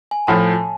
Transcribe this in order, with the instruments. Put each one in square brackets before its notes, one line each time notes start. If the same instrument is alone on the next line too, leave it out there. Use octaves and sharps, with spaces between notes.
[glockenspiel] G#5
[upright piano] A2 F3 [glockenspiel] A5